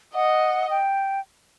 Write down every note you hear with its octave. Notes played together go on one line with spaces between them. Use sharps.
D#5 F#5
G5